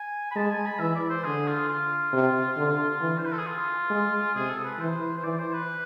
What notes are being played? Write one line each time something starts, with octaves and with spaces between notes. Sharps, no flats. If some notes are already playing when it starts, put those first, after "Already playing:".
Already playing: G#5
B5
G#3 A5
G#5
B5
E3 E5
D5
C5
D3 G#4
F4
F4
C3
D3
E3
C5
B4
A4
G#4
F4
G#3
C3 G#4
A4
B4
E3 C5
C5
E3 D5
C5
B4